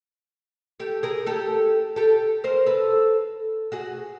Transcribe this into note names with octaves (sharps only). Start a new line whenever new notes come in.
G4 A4
G#4 A#4
G4 A4
G4 A4
A#4 C5
A4 B4
F#4 G#4